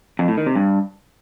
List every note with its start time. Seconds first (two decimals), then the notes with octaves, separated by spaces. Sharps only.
0.19 F2
0.28 A2
0.37 D#3
0.46 C3
0.56 G2